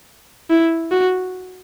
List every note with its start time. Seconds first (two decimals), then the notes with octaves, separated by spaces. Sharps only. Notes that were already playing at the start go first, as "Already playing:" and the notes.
0.50 E4
0.91 F#4